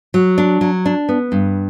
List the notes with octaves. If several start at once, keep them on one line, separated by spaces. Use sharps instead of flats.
F#3
D4
F#3
D4
B3
G2